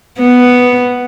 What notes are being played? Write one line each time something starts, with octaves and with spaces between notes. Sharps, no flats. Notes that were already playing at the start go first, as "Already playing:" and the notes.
B3